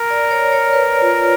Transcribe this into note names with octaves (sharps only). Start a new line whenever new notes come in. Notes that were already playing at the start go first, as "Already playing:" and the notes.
Already playing: A#4
D5
C#5
C#5
B4
F4